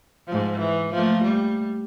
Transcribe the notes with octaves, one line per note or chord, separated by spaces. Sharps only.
G#2 F3
E3
F3 A3 A#3
G3